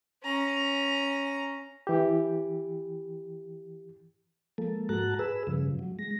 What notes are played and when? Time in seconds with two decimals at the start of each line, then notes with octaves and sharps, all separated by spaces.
0.23 C#4 A#5
1.87 E3 G4
4.58 F3 G#3 A#3 A4
4.89 G#2 F#4 A5 A#5 F#6
5.19 G#4 B4 E6
5.47 G2 C#3 F3
5.79 F#3
5.99 G#3 A#6